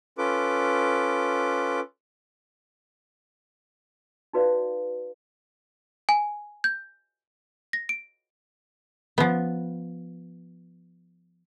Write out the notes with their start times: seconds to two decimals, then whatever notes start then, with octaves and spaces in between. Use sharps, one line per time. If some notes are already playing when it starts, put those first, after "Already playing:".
0.18 C#4 F4 A4 B4 D6
4.33 D#4 F#4 B4 D5 F5
6.09 G#5
6.64 G6
7.73 A#6
7.89 D7
9.18 F3 B3